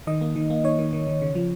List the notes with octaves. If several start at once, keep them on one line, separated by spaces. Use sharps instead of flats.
D#3 D#5
A#3
D#3
A#3
D#3 C#5
D#3
D#3
D#3
C#3
F3